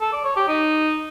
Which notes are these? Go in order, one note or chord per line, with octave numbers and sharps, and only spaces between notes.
A4
D5
C#5
G4
D#4